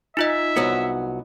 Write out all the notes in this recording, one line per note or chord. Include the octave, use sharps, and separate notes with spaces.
D#4 F4 D#5 E5
C2 F#3 B3